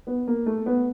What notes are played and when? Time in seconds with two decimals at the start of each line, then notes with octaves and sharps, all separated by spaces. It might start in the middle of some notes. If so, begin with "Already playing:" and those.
0.07 B3
0.27 A#3
0.46 A3
0.66 B3